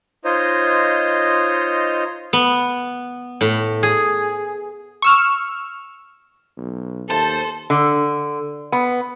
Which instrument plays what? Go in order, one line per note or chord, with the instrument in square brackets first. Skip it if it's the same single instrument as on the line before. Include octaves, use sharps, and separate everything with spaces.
[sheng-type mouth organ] D#4 F4 C5 C#5 D#5
[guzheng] B3
A2
G#4
[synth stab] C#6 E6 F6
[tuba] B1
[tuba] D#2 [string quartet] A4 [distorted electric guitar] C5 [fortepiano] A5
[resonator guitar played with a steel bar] D3
B3